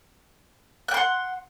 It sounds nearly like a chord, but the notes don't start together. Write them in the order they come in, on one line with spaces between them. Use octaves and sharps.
F#6 G5 C6 F#5